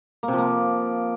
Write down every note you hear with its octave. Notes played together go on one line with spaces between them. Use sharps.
A#3
C3
F3
A#3